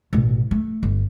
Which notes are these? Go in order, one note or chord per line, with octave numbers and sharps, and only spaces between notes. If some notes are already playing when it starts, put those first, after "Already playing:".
A1 B2
A3
G1